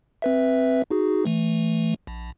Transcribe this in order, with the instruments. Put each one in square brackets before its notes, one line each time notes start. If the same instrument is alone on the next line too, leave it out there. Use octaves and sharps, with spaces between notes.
[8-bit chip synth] C4 B4 E5
D#4 F#4 G#4
E3 A3
A#1